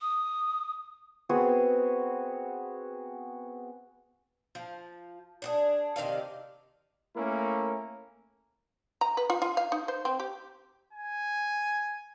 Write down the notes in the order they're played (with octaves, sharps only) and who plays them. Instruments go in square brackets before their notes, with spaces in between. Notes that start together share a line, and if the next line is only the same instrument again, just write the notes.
[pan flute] D#6
[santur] B3 C4 F#4 G#4
[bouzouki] F3
D4 F#4 G#4
C3 D#3 D5 F5
[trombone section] A3 A#3 C#4 E4 A#4
[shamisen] A#5
B4
F4
F4
F5
D#4
C5
C4
G4
[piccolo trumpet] G#5